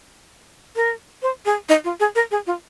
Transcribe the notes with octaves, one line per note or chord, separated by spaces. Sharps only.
A#4
C5
G#4
D#4
F4
G#4
A#4
G#4
F4